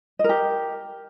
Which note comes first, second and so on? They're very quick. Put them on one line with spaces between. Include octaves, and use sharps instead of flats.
D#5 A#4 G4